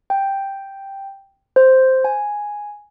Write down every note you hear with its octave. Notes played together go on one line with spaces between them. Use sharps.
G5
C5
G#5